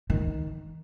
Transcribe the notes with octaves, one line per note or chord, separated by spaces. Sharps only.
D#3